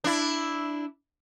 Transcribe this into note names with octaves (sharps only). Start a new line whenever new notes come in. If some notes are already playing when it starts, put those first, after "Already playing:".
D4 E4